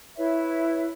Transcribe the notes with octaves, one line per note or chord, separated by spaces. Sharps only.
E4 B4 C#5 E5